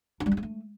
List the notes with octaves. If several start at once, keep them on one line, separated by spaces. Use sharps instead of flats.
E4
G3
E4
G#3
A3